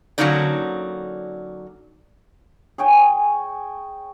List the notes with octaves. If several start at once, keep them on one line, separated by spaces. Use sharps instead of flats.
D3 F#3 A#3 C#4 D#4 D5
G#4 C#5 G5 G#5